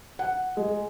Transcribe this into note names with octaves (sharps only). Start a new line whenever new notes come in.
F#5
G#3